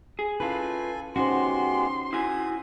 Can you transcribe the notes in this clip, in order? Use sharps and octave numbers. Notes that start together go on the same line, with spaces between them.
G#4
C#4 E4 F4 A4 B4 G#5
G#3 B3 C#4 D#4 F#4 G4 C5 C6
E4 F#4 G#5 D#6